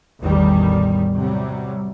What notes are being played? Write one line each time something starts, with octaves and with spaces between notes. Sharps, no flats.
A1 E2 D#3 G3
C3 F#3 G3